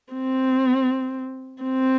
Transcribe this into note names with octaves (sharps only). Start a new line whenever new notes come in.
C4
C4